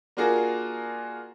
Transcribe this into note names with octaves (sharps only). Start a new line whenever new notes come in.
A#3 D4 F4 F#4 G#4 A#4